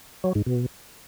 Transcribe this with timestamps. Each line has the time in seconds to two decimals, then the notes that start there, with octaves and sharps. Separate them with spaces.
0.24 F#3
0.35 G#2
0.46 B2